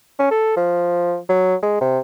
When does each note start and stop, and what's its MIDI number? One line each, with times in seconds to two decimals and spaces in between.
0.19 0.30 61
0.31 0.56 69
0.57 1.18 53
1.29 1.55 54
1.63 1.77 56
1.81 1.99 48